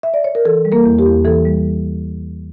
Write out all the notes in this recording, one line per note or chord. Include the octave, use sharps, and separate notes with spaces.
E5
D5
C#5
A#4
E3 A4
G3
A#3 A#4
E2
G4
E2
E3 A4
G3